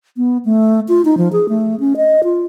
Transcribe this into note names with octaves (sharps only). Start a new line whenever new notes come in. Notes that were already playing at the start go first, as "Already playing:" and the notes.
B3
A3
F4
D#4
F3
G#4
A3
C#4
D#5
F4